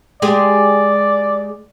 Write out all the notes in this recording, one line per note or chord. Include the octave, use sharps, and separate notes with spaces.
G#3 G4 G#4 D5